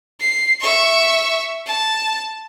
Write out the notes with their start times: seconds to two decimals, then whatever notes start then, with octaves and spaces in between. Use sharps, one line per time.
0.20 C7
0.60 E5 C#6
1.66 A5